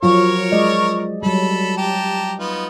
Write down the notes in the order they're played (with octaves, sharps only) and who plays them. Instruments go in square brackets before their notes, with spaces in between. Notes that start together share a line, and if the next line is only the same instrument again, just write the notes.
[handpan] F3 F#3 F4 [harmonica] A#4 C#5 C#6
[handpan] G#3 D5 D#5
[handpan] F#3 G3 [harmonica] A4 B5
[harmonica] G4 A5 A#5
B3 D#4 F4